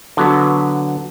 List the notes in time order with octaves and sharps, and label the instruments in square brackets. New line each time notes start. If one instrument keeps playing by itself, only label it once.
[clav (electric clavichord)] D3 F#3 B3